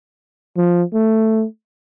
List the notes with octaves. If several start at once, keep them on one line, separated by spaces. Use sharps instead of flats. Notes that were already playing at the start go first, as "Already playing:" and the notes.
F3
A3